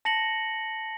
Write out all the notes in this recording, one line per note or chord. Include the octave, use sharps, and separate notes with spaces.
A5 A#6 C#7 F#7